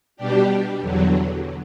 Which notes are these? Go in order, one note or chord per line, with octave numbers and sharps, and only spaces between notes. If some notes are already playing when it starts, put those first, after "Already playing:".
B2 G3 D4 G4
E2 D3 F#3